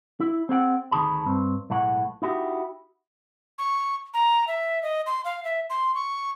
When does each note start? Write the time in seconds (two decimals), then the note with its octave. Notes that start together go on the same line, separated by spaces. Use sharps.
0.20 E4
0.49 C4 G#4 F#5 G5
0.91 D2 D#3 F#4 G#4 A5 B5
1.26 G2 C4
1.70 B1 A2 G#3 F#5
2.22 D#4 E4 F#4 G4
3.58 C#6
4.14 A#5
4.47 E5
4.83 D#5
5.06 C6
5.25 F5
5.44 E5
5.70 C6
5.95 C#6